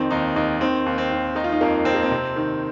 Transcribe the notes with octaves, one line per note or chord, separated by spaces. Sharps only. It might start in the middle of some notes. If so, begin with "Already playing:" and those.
Already playing: F2 D#3 C4
D#2 D#4
D#2 D#4
D#3 C4
D#2
C4
D#2
D#3 D#4
F4
D#4
F2 A#3
F2 C4
A#3
C4
C3
D#3